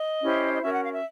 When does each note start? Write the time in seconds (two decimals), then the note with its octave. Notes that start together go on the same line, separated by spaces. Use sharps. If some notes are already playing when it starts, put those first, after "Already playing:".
Already playing: D#5
0.21 C#4 E4 G4 C5
0.54 D#5
0.62 C#4 F#4 A#4 E5
0.73 F#5
0.82 F5
0.93 E5